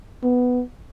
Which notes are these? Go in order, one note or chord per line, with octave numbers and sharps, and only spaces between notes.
B3